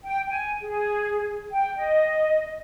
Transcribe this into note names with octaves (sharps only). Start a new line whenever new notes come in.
G5
G#5
G#4
G5
D#5